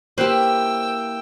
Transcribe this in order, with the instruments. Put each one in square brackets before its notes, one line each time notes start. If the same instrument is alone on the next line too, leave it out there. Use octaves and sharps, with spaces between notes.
[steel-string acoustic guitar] A#3 E4 [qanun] G4 B4 [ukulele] C5 [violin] G5 E6